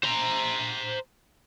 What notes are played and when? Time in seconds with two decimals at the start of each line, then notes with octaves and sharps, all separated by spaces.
0.03 C5 A#5